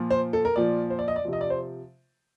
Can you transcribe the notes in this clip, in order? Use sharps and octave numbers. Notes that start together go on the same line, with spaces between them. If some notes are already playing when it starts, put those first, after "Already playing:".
Already playing: A#2 F3
C5
A4
A#4
A#2 F3 D5
C5
D5
D#5
D5
C3 F3
D#5
D5
C5